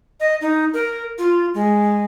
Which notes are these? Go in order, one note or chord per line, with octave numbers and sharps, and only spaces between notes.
D#5
D#4
A#4
F4
G#3